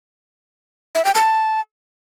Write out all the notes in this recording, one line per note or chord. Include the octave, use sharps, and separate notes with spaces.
E5
G5
A5